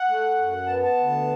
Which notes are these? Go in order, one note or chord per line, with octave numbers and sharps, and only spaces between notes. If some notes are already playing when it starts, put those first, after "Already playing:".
Already playing: F#5
A3
F#2
B3 A5
A5
D2